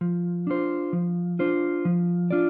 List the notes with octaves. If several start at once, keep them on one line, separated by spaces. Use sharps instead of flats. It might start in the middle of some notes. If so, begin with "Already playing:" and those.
F3
D4 F4 C5
F3
D4 F4 C5
F3
D4 F4 D5